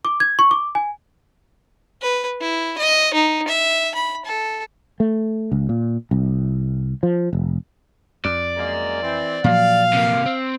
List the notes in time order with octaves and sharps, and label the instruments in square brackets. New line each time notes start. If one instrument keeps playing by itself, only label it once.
[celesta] D6
G#6
C#6
D6
G#5
[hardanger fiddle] B4
E4
D#5
D#4
E5
B5
A4
[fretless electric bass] A3
C#2
A#2
C2
F3
F1
[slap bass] F2 [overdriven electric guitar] D5
[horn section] F#2 G#3 A#3
E3 C4
[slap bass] A#2 F3 F#3 [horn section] F5
[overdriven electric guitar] C3 A#3
C4